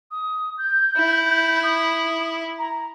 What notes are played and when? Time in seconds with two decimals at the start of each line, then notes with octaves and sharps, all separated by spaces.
0.11 D#6
0.58 G6
0.97 E4
1.63 D#6
2.59 A#5